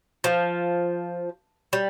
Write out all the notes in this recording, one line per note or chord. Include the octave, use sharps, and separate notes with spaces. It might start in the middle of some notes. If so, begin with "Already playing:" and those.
F3
G3